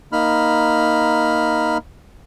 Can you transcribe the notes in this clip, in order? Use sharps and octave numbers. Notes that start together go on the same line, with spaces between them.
A#3 D#4 B5 F6